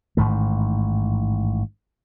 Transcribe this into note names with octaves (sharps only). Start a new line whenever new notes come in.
A1 G#2 D#3 A3